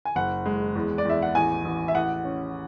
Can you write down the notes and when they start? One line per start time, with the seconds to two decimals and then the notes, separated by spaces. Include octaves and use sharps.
0.05 G#5
0.15 F#1 F#5
0.45 G#3
0.75 E2
0.98 D5
1.05 E2 E5
1.22 F#5
1.35 A1 G#5
1.65 A1
1.88 E5
1.94 A1 F#5
2.25 C#4